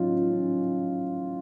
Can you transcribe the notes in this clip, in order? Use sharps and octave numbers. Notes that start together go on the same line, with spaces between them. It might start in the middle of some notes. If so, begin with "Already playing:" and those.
Already playing: A2 F#3 C#4 D#4 F4
C#4